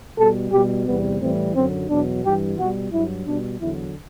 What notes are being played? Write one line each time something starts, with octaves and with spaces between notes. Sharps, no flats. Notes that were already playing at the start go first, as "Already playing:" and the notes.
B2 G3 A4
B2 G3 G4
E2 C3 G3 B3
A2 E3 G3 C4
F#2 D3 F#3 C4
E2 B2 F#3 D4
G2 E3 G3 G4
B2 G3 F#4
G2 F#3 E4
B2 G3 D4
E2 D3 F#3 E4